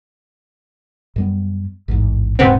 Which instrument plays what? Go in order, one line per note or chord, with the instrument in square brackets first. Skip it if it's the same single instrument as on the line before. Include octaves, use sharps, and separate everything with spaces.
[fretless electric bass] F#2 G3 B3
A1 E2 G#2
[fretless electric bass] D#1 G#2 [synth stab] C3 B3 C4